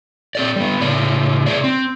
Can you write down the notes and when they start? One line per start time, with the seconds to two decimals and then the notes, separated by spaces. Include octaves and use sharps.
0.35 C4 A4 D5
0.56 G3 B3
0.80 A2 C#3 D5
1.46 C3 G#4 C5 D5
1.64 C4